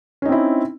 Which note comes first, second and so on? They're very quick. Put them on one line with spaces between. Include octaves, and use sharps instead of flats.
C#4 D#4 C4 E4